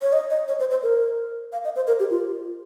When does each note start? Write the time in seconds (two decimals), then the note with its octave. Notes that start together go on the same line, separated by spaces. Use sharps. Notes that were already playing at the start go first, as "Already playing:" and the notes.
0.02 C#5
0.13 D#5
0.30 D#5
0.48 C#5
0.60 C5
0.71 C5
0.83 A#4
1.53 F5
1.65 D#5
1.76 C5
1.87 A#4
2.00 G4
2.11 F4